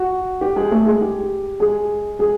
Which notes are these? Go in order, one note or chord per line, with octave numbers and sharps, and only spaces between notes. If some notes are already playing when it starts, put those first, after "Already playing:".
Already playing: F#4
G4
G#3 G#4
A3 A4
G#3 G#4
G4
G#3 G#4
G#3 G#4